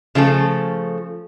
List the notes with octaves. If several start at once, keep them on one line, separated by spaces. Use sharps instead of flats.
C#3 F3 A3 A4